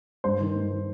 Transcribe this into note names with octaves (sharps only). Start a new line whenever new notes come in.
G2 C5
D#3
G2
D#3